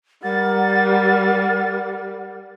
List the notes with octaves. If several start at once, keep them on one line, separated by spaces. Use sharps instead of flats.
G3 A#4 F#5 A6